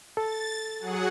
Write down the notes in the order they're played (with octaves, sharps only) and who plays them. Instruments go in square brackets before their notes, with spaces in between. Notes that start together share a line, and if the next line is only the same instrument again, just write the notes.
[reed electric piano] A4 [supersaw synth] A6
[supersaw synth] F#3 G#4 F#5